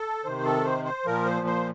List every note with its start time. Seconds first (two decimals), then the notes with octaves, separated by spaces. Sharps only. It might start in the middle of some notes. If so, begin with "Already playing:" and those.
Already playing: A4
0.24 C3 D#3 C5
0.45 A4
0.65 C5
0.85 C5
1.05 A#2 F3 A#4
1.26 C5
1.47 C5